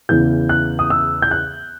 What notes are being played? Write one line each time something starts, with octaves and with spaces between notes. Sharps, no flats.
E2 C#3 E3 G6
F#6
D#6
E6
G6
F#6